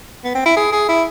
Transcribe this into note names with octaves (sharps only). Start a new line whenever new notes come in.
B3
C4
E4
G#4
G#4
E4